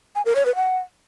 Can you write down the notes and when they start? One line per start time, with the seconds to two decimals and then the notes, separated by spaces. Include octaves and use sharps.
0.15 G#5
0.26 A#4
0.36 C#5
0.46 B4
0.56 F#5